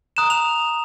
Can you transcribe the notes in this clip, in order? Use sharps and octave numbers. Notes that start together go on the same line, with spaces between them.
A#5 D#6 F#6 E7
F7